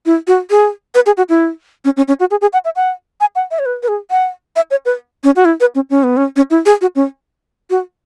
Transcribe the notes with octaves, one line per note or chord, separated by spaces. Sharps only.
E4
F#4
G#4
B4
G#4
F#4
E4
C#4
C#4
C#4
F#4
G#4
G#4
F#5
E5
F#5
G#5
F#5
E5
C#5
B4
B4
G#4
F#5
E5
C#5
B4
C#4
F#4
E4
B4
C#4
C#4
B3
C#4
C#4
E4
G#4
F#4
C#4
F#4